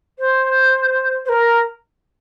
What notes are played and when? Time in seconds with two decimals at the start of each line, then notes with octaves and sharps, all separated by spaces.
0.18 C5
1.25 C5
1.28 A#4